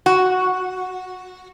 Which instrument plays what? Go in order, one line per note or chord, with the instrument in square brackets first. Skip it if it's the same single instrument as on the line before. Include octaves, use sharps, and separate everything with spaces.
[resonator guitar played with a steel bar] F#4